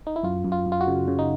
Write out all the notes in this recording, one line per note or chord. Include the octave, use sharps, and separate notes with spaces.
D#4
E4
F#2 F4
F#2
F4
F#2
F4
F#4
C#3
C#3
D#4